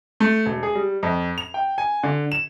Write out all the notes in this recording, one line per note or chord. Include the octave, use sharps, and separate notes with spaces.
A3
E1
G#4
G3
F2
F7
G5
G#5
D3
E7